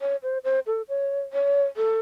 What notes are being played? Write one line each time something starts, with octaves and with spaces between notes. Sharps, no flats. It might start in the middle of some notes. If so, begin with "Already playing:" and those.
C#5
C5
C5
A4
C#5
C#5
A4